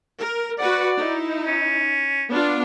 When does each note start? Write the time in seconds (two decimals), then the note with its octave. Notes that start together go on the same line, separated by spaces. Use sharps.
0.19 A#4
0.58 F#4 B4 D5 F#5
0.98 D#4 E4
1.47 C#4
2.29 B3 D4 F4